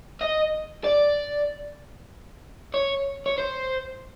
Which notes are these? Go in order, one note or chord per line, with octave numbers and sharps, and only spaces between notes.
D#5
D5
C#5
C#5
C5